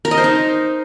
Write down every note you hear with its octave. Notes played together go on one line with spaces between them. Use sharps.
A#4
D#5
C5
D#4